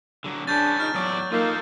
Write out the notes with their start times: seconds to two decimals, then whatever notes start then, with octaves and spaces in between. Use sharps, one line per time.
0.24 D3 F#3
0.47 C#4 D4 G#4 B4 G6 A6
0.80 D#4 F6
0.95 E2 A2 F#3 D5
1.32 A#3 D#4 F4 A4 F5